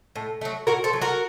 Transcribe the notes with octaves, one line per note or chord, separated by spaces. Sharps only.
A2
F#3 A3
A2 F#4 A#4
A4 C5
F#3 A3
F#4 A#4